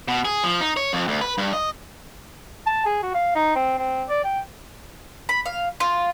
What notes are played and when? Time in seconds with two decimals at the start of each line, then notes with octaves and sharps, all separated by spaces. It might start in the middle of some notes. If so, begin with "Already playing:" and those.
0.08 B2
0.25 G#4
0.44 F3
0.61 D#4
0.77 C#5
0.93 F2
1.08 D2
1.21 B4
1.38 G2
1.53 D#5
2.66 A5
2.86 G#4
3.03 F#4
3.14 F5
3.35 D#4
3.55 C4
3.78 C4
4.09 D5
4.24 G5
5.29 B5
5.46 F5
5.80 F4